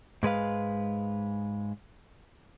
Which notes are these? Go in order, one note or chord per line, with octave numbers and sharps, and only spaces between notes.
G#2 G#3 B4 F5